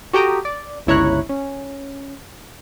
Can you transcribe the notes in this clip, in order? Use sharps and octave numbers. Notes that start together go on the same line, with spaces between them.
F#4 G4 A4 G5 A#5 D#6
D5
G1 C#2 E4 C#5 A#5 F#6
C#4